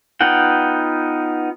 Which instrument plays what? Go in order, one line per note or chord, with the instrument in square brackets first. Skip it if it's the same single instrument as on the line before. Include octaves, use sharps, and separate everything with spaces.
[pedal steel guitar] B3 D#4 F4 F#5 G5